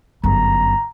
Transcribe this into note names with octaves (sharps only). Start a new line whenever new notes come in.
G1 F#2 A#5